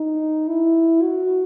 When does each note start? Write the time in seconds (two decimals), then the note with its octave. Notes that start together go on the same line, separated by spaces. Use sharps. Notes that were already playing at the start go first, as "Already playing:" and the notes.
Already playing: D#4
0.48 E4
1.02 F#4